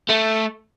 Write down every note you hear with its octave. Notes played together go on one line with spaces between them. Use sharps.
A3